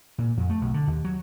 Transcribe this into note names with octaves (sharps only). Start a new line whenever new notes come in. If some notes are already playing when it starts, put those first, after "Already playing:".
A#2
F2
A3
B1
D3
D#2
F#3